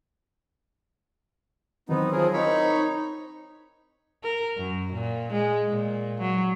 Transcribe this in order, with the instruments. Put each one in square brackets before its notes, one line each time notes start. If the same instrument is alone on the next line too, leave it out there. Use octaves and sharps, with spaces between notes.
[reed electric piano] D#3 E3 F#3 [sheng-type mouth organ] B3 D#4 [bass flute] C4
[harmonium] F3 [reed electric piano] F#3 C#5 [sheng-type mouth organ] G#4 A#4
[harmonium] D#4 [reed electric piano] E4 A#4 [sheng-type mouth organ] C#5 B5 C#6
[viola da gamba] A#4
F#2
A#2
G#3
A#2
F#3